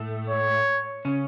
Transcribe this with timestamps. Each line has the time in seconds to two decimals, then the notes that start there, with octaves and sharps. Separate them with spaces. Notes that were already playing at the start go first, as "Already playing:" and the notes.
Already playing: A2 A3
0.29 C#5
1.05 C#3 C#4